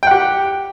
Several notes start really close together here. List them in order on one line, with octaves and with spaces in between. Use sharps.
G5 F#5 G4